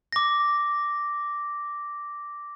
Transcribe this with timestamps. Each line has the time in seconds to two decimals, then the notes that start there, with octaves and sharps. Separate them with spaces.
0.12 D6 A#6